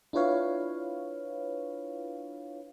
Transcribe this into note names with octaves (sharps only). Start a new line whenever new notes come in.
D4 E4 F4 B4 C#5 F5